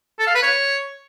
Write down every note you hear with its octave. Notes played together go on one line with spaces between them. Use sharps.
A4
F5
B4
C#5